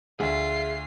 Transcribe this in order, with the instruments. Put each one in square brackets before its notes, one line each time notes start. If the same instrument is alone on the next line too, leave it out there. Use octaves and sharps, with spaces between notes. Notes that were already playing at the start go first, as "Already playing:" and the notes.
[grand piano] D2 [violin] F4 C7 [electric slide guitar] G#4 E5